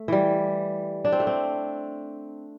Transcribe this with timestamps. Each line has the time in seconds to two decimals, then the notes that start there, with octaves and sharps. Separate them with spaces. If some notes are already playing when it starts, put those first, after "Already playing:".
Already playing: A3
0.08 E3 G3
1.05 D4
1.12 C4
1.20 A3
1.27 C4